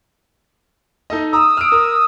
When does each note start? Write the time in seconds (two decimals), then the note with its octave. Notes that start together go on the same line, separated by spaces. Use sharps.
1.10 D#4 A4 D#5
1.33 A#5 D#6 E6
1.57 F6 D7
1.72 A#4